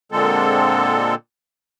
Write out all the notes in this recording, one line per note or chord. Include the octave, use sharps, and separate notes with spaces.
A#2 D3 G#3 C4 A4